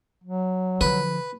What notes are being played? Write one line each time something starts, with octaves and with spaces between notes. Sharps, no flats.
F#3
D3 F3 B4